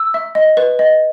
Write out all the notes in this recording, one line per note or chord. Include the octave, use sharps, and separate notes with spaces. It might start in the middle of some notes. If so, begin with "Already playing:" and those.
Already playing: E6
E5
D#5
B4
D#5